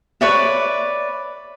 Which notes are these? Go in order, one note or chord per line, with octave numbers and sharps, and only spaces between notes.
B4 C#5 D5 E5